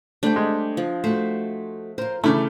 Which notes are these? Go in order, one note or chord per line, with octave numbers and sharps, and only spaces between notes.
G3 A3 D4 C5 G5
G#3
F3
A3 F#4 C5
F4 A#4 C5
C#3 E3 A3 E4 D5